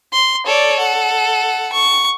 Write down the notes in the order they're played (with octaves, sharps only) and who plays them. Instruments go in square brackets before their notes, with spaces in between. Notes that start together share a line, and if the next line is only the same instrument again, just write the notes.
[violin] C6
[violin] A4 [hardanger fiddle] C#5 D5
[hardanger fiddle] F#5
C#6